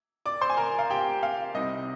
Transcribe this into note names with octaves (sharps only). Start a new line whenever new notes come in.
D5 D6
C5 C6
G#5
A#4 A#5
F5
G4 G5
F5
C2 C3 G3 C4 D#4 D#5